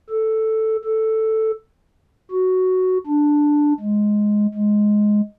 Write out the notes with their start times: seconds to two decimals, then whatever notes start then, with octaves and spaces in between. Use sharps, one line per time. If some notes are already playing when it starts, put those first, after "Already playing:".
0.10 A4
0.85 A4
2.32 F#4
3.06 D4
3.80 G#3
4.54 G#3